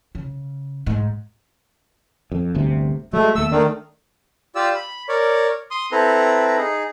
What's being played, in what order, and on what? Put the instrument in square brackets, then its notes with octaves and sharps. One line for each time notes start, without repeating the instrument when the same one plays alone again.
[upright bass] C#3
G#2
[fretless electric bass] F2
G1 D2 C3
[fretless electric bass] F#3 G#3 [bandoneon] A3
[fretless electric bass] D#2 A3 [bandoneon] E6
[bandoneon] D#3 [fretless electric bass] A3 D4
[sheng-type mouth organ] F4 G4 D5 E6
B5
A#4 C#5 D5
C6 D#6
C4 E4 A4 B4 A#5
D#4 G#4